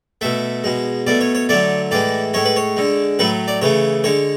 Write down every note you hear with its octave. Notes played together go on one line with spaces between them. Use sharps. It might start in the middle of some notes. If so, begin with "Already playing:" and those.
B2 A3 E5
B2 G#3
B2 A3 D5
C#5
C#5
D3 F#3 A3 D5
A2 E3 G#3 D5
A2 G#3 C#5
B4
C#5
D3 G#3
A2 F#3 A3 B4
D5
C#3 E3 A3 C#5
D3 G#3 C#5